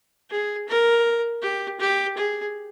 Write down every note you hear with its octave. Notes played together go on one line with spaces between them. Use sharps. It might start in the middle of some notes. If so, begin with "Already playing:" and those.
G#4
A#4
G4
G4
G#4